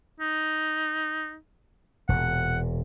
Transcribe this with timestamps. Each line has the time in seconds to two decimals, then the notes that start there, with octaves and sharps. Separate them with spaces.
0.20 D#4
2.09 E1 A#2 F#5